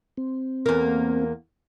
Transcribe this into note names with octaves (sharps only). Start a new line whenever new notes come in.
C4
E2 A#3